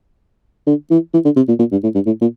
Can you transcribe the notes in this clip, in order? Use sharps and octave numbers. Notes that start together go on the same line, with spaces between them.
D3
E3
E3
D3
C3
A#2
A#2
G2
A2
G2
A2
A#2